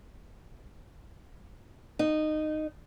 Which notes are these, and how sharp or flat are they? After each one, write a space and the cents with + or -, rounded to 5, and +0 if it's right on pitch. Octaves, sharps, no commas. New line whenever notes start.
D#4 -15